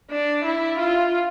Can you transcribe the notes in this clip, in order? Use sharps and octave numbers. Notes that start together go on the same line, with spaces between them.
D4
E4
F4